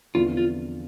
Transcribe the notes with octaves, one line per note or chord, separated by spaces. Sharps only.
E2 D3 F3 C4 E4 F4
F4